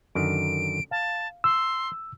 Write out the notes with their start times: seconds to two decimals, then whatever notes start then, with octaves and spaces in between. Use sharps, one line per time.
0.15 F#2 D3 D#3 D7
0.91 F5 A5
1.44 C6 E6